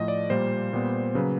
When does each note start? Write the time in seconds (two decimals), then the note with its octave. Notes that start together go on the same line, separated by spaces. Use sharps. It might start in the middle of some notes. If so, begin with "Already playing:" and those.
Already playing: A2 F3 A3 D#5
0.08 D5
0.30 A#2 G3 A#3 C5
0.73 A#2 G3 B3
1.15 C#3 F#3 A#3 B4